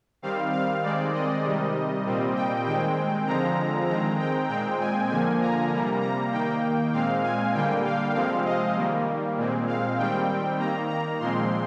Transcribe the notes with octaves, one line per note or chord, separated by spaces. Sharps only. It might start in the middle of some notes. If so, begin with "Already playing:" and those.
D#3 G3 C4 F5
F5
D#3 G#3 C4 D5
D#5
C3 D#3 G3
A#2 G3 C4
G5
D#3 G#3 C4 G5
D3 F3 G#3 C4 A#5
D#3 G#3 C4 A#5
G5
A#2 G#3 C4 G5
G#5
D3 F3 A#3 G#5
A#5
C3 G3 A#3
A#5
D#3 A#3 G5
A#2 G#3 C4 F5
G#5
D3 G3 A#3 G5
F5
C3 F3 G#3 C4 F5
D#5
D#3 G3 A#3
A#2 G#3 C4
F5
D#3 G3 C4 G5
D#3 A#3 A#5
A#5
A#2 F3 G#3 C4 C6